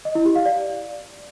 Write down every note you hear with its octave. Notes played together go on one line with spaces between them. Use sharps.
D#5
E4
G4
F5
D5